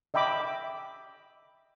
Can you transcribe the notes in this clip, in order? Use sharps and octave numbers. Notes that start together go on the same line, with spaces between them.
D#5 E5 G5 B5 D6